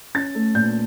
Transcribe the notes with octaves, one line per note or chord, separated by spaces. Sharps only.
C#4 A6
A3
A#2 G6